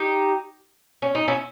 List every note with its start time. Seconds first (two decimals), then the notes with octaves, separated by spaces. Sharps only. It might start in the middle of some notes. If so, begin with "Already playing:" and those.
Already playing: D#4 G4
1.02 C#4
1.15 D#4
1.28 C#4 E4